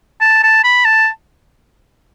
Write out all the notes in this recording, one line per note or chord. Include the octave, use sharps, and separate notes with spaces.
A5
A5
B5
A5